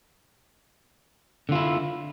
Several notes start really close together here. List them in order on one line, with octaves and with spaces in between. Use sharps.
D3 F4 E4